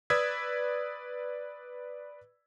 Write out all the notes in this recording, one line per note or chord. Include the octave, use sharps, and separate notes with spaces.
B4 D5 D#6 E6 G#6 B6